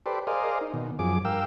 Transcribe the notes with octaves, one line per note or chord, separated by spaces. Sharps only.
G4 A4 B4 C5 D5
G#4 A#4 C5 D5 D#5 F5
D#4
B2 D#3
F#2 F3 G#4 D6
G2 A#4 F5 G5 E6